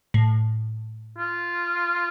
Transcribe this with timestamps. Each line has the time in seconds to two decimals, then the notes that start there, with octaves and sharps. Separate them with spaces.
0.14 A2
1.17 F4